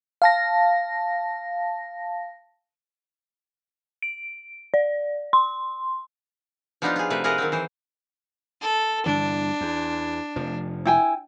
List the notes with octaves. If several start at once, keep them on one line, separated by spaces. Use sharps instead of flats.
F5 A5 A#6
D7
D5
C6
F3 B3 D4 D#4 F4 G4
F4 G#4
C3 A3 B4
F4 G#4 A#4 B4 D#5 F#5
D#3 F#3 C4
E3 C5
A4
G2 D3 E3 D4
E2
F1 F3
E4 G5 G#5